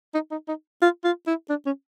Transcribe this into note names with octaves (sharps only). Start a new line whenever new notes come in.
D#4
D#4
D#4
F4
F4
E4
D4
C#4